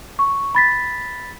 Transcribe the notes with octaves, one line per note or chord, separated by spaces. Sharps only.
C#6
B5 A6 B6